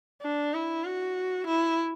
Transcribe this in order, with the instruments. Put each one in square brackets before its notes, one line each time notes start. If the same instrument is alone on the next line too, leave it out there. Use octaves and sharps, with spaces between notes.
[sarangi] D4
E4
F#4
E4